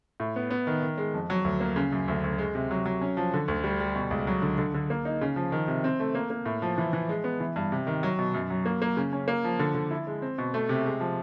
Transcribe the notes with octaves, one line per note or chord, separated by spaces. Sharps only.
A2
B3
B3
D#3
D#3
G#3
F2
F#3
D2
A#3
C#3
F#2
D2
D2
G#3
C3
F#3
F#3
C#4
F3
D3
D2
G3
G3
B2
C#2
F#3
D3
D3
D3
A#3
D#4
C#3
F3
D#3
C3
C4
A3
A#3
A#3
A2
F3
E3
E3
G#3
B3
E3
G2
C3
D#3
F#3
B2
F#2
F#3
A#3
A#3
C#3
C#4
A#3
F3
D3
D3
E4
G#3
C4
B2
A3
C3
G#3
F3